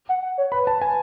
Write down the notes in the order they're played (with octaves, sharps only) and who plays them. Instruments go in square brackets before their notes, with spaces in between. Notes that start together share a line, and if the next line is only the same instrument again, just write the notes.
[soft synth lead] F#5
F#5
C#5
[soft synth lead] B4 [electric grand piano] B5
[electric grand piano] A5
G#5